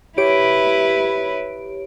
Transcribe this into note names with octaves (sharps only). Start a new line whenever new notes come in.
E4 G4 B4 C#5 D7